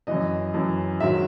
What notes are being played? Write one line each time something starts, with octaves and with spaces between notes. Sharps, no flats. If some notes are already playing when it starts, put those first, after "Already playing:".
F#2 E3 D#5
F#2 E3
G#2 D#3 F#3 E5